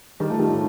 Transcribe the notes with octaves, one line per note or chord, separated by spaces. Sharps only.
D#3 G3
F3 A3
D#3 G3
A2